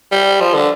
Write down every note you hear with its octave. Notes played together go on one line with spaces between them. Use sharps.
G3
F3
D3